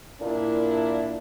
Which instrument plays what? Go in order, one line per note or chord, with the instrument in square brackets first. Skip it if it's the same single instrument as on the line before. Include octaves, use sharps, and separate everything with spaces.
[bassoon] A#2 [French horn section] A#3 D4 E4